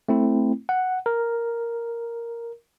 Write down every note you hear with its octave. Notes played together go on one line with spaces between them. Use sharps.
A3 C4 E4
F#5
A#4